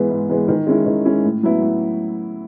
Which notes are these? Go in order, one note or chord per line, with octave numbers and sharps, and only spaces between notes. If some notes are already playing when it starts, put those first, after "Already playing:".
Already playing: G#2 E3 G#3 B3
G#2
E3 G#3 B3
D#3
G#3 C#4 E4
D#3
G#3 C#4 E4
A2
F#3 B3 E4
A2